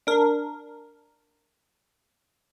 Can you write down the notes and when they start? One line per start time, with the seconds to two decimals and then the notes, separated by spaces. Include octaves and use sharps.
0.07 D4 A#4